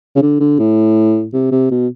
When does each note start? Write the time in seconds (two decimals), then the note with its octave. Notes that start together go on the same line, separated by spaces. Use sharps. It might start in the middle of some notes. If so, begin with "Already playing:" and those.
0.16 C#3
0.22 D3
0.40 D3
0.59 A2
1.33 C3
1.51 C3
1.71 B2